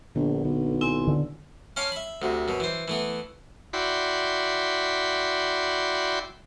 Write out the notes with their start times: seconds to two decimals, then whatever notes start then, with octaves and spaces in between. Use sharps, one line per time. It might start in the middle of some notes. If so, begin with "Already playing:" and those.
0.15 A#1 A#2 D3 B3
0.44 B1 D3
0.81 C4 E4 G#5
1.07 D3
1.77 C#4 F5 A5 C6 D6
1.92 E5 B5
2.22 D2 C3
2.48 F#2 B2
2.60 E3 C5
2.88 E3 A3 B3
3.73 E4 F#4 D5 G5 B5 C6